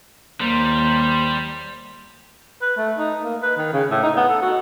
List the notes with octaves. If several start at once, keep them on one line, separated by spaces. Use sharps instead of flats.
D#2 G3 A#3 C5
B4
A3
D#4
A#3
B4
D#3
C#3
A2
D#4
B3
A4
F#4